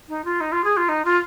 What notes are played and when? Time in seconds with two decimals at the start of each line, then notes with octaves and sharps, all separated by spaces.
0.08 D#4
0.24 F4
0.40 D#4
0.51 F4
0.64 G#4
0.76 F4
0.88 D#4
1.04 F4